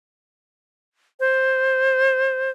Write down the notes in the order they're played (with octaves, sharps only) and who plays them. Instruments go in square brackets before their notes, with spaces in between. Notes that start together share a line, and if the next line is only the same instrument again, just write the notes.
[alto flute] C5